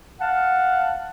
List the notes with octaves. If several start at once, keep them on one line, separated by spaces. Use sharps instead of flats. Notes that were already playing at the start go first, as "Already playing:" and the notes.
F5 F#5 A5